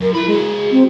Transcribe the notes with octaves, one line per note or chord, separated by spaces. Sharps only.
F#2 A#4
E4 A#4 B5
G#3 F#4 G#4
C4